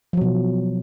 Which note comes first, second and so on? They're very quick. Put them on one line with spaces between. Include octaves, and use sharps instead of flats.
F3 F#3 B2